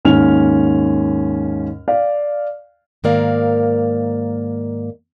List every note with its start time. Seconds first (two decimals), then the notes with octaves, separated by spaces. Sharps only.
0.05 D#2 G#2 C#4 F6 F7
1.88 D5 F5
3.04 G#2 D#3 A#3 A#4 D5 F5